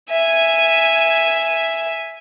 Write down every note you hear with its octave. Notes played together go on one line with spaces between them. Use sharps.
E5 G#5